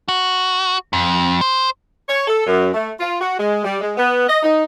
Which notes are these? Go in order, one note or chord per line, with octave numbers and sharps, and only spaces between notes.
F#4
F2
C5
C#5
A4
F#2
A3
F4
F#4
G#3
G3
G#3
B3
D#5
D#4